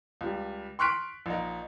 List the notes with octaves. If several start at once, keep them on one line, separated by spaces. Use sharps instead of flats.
C#2 G3
C6 C#6 F6 F#6 B6 D7
A#1 D#4